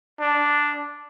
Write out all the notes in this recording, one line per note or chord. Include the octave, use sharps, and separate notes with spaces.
D4